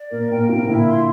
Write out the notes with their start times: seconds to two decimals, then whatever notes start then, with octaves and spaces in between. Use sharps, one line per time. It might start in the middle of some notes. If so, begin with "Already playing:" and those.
Already playing: D5
0.11 A#2 A#4
0.30 A#2 G5
0.49 A2 C3 A#4
0.68 A#2 D3 E4
0.87 C6